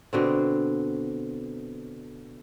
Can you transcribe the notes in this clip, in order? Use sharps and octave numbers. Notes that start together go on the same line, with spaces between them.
B2 D3 C4